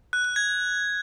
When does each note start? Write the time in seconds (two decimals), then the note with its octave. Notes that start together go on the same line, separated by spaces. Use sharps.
0.13 F#6
0.25 F#6
0.36 G#6